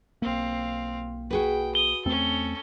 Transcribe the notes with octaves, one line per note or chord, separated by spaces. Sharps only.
B1 A#3 C4 F5
F#4 G#4 B4 G5
D#6 G7
E2 A3 C4 C#4 A4